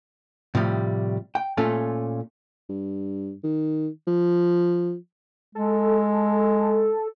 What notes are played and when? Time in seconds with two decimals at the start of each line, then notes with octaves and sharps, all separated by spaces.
0.55 A2 C3 F3 G3
1.35 G5
1.57 A#2 A3 C#4 F4 A4
2.69 G2
3.43 D#3
4.07 F3
5.55 G#3 A4